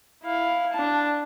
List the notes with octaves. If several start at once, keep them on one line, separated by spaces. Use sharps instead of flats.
E4 F5
D4 A5